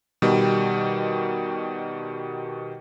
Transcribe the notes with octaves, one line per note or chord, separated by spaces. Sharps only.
B2 D#3 G3